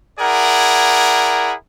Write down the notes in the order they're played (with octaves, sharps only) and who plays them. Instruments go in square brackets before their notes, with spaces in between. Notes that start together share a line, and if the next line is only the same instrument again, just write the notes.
[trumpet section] E4 G#4 A#4 D5 F#5